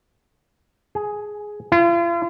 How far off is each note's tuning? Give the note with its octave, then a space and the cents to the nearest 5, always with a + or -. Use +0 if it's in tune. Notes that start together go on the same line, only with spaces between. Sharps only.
G#4 +5
F4 -40